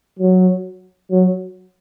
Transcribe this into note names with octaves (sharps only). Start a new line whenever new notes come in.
F#3
F#3